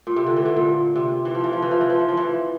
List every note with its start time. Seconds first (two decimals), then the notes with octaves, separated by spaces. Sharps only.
0.07 A#2
0.16 C3
0.26 D3
0.36 E3
0.45 D3
0.56 A#2
0.96 C3
1.25 E3
1.35 F3
1.44 E3
1.53 F3
1.62 E3
1.71 F3
1.81 E3
1.90 F3
1.99 E3
2.09 F3
2.17 E3